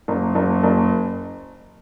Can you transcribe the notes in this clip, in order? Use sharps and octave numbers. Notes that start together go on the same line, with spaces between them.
F#1
F#1
F#1